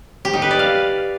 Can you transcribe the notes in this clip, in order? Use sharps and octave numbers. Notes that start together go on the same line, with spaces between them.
G4
D#4
B4
D5
F5